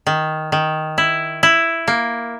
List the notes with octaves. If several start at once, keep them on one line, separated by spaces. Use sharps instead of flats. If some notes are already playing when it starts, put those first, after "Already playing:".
D#3
D#3
E4
E4
A#3